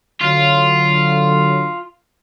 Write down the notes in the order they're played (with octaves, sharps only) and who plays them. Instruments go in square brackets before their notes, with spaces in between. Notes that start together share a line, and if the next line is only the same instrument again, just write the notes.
[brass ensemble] D3 F#3 [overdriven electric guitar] F4